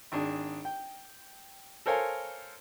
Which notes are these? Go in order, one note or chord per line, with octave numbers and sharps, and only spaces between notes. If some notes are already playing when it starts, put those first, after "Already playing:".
G#1 D4 G#4
G5
A4 A#4 C5 C#5 F5 G#5